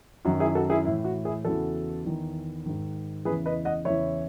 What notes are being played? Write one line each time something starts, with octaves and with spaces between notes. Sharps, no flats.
F#2 D#3 F#4
E4 G#4
F#4 A4
E4 G#4
A2 E3 E4
F#4
E4 G#4
E2 C#3 E3 F#4 A4
E2 D#3
G#2 D#3
E2 C#3 E3 G#4 B4
B4 D#5
D#5 F#5
E2 C#3 E3 C#5 E5